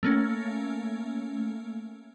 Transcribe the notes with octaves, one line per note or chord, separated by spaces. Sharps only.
A3 A#3 C#4